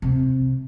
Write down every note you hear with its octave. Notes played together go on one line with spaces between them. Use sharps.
C3